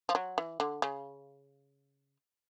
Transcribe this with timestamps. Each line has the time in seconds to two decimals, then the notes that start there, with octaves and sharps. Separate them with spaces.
0.09 F3
0.15 F#3
0.38 E3
0.60 D3
0.82 C#3